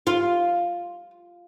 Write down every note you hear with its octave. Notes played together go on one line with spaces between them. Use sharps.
F4